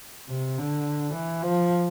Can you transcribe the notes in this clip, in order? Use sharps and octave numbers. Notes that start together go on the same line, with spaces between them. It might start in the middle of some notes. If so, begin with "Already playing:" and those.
C3
D3
E3
F3